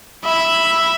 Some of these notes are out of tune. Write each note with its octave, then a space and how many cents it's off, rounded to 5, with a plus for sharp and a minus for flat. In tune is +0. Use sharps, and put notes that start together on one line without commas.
E5 +0 B5 +0